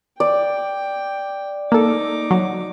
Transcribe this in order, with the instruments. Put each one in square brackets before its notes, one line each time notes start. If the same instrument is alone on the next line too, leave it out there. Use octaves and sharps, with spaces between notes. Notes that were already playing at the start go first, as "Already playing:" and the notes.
[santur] D5 [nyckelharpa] G5
[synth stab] A#3 A4 [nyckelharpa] D#4 D6
[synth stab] F#3